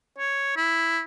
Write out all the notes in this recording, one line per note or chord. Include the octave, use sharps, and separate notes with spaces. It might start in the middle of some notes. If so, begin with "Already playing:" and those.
C#5
E4